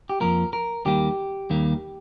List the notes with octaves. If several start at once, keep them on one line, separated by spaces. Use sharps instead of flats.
G4
F2 F3 A#3 A#4
A#4
D#2 D#3 G3 A#3 G4
D#2 D#3 G3 A#3